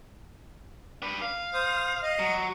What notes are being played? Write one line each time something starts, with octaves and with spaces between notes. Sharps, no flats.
D4 B4
F5
C5 D#6
D#5
F#3